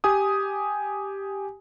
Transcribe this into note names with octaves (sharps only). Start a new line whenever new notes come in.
G4 G#5 D#6